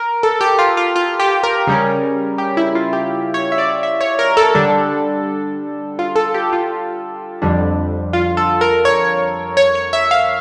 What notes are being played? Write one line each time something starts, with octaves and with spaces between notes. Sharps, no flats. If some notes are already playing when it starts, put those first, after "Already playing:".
Already playing: A#4
A4
G4
F4
F4
F4
G4
A#4
C#3 G3 C#4
G4
E4
F4
G4
C#5
E5
D5
E5
C#5
A#4
A4
D3 G3 D4
F4
A4
G4
F4
F2 D3 G3 D4
F4
A4
A#4
C#5
C#5
C#5
E5
F5